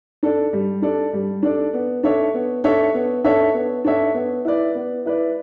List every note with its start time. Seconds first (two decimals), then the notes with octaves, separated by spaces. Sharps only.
0.23 D4 A4 D5
0.53 G3
0.82 D4 A4 D5
1.13 G3
1.43 D4 A4 D5
1.74 B3
2.03 D4 A4 C#5 E5
2.34 B3
2.64 D4 A4 C#5 E5
2.94 B3
3.24 D4 A4 C#5 E5
3.54 B3
3.85 D4 A4 C#5 E5
4.14 B3
4.45 E4 B4 D5
4.75 B3
5.06 E4 B4 D5